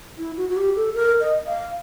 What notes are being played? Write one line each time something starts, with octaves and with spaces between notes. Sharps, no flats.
E4
F#4
F#4
G4
A4
A#4
D#5
F5